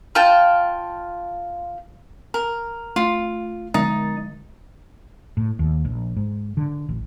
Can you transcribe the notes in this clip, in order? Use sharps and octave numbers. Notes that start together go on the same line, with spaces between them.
F4 G5 A5
A#4
A3 F4
D3 G#3 D#4 A6
A2
D#2
A#1
G#2
D3
A1